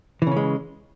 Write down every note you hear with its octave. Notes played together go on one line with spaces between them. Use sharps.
C#3 E3 G#3 C#4